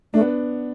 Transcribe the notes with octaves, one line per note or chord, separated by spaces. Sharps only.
A3 D4
B3